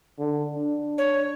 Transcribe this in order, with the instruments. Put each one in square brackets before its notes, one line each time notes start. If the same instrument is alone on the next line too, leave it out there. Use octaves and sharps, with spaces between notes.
[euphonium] D3
D4
[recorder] C#5